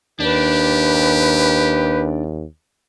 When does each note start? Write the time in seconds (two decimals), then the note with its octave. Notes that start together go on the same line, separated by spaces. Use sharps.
0.20 D#2 D4 G4 B4